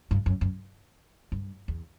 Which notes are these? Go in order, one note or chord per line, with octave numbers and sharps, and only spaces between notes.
G2
F#2
F#2
G2
E2